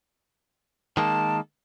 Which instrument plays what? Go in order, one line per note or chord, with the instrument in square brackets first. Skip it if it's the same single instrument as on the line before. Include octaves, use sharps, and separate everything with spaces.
[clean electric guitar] D#3 G#3 A#3 [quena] A5